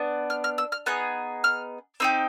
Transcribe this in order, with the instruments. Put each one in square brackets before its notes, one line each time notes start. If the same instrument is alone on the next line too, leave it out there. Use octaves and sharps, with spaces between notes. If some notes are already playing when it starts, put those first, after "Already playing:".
Already playing: [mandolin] B3 D4
F6
F6
E6
F6
B3 D#4 G#4 F#6
F6
C4 D#4 G4 E6